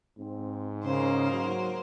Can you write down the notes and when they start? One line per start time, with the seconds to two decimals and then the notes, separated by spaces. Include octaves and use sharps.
0.18 G#2 C4
0.83 C#3 A#3 C5
1.31 F#3